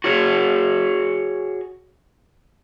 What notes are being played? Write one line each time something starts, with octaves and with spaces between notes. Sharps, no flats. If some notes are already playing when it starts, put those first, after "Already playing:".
F#4 G#4 C#5